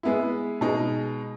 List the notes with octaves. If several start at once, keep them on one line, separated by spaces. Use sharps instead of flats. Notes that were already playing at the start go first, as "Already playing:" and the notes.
G#3 B3 E4
B2 G#3 D#4